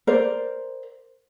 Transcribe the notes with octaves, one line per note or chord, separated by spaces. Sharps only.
A#4 C5 D5